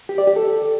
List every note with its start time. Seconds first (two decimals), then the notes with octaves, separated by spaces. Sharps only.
0.09 G4
0.18 D5
0.27 G4
0.36 A4